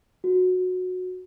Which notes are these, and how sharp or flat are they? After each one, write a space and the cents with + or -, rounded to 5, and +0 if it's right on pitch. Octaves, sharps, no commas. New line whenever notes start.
F#4 -15